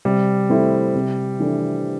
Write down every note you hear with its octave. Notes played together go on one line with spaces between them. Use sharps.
C3 G3
A3 C4 E4
C3
E3 A3 D4